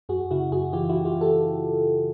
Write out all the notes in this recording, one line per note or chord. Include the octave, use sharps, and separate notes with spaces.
F#2 F#4 G#4
C#3 E4 F#4
F#2 F#4 G#4
E3 F4 G4
E4 F#4
E3
F4 G4
E3
G4 A4